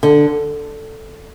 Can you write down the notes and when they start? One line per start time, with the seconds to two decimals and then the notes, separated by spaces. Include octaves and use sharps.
0.03 D3